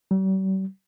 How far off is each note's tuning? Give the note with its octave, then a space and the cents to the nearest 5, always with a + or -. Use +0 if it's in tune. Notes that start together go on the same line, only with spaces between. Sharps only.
G3 -45